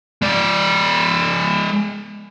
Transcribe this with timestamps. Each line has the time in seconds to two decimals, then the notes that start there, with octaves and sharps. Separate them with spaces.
0.22 G#3 D5